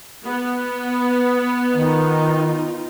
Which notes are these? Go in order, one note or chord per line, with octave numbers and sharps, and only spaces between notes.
B3
D#3 D#4 F4